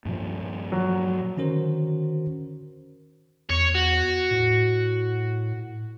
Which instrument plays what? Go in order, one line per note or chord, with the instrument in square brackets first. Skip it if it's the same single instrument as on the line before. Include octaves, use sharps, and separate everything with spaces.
[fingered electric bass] G2 A#2 F3
[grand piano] F#3
[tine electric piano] D3 D#3 C#4 F#4 A#4 C5
[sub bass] E2 [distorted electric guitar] C#5
[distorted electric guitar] F#4
[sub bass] A2